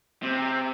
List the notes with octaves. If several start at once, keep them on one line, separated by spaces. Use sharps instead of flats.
C3